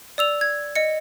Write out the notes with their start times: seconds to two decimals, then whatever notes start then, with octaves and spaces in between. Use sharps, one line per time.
0.18 D5 E6 F7
0.41 G#6
0.76 D#5 C#7